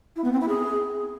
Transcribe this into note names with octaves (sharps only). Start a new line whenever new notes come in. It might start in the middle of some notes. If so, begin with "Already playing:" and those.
E4
B3
C4
E4
G#4